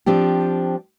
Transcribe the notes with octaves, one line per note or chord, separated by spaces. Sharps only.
F3 C4 D4 G4